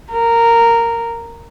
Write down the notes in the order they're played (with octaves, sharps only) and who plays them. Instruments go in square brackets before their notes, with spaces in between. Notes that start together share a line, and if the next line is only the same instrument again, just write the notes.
[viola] A#4